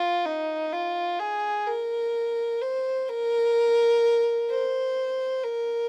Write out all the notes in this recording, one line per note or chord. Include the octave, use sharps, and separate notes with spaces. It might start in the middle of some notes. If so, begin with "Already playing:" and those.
Already playing: F4
D#4
F4
G#4
A#4
C5
A#4
C5
A#4